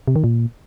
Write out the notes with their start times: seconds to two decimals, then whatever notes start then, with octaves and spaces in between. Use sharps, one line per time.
0.08 C3
0.16 D#3
0.24 A#2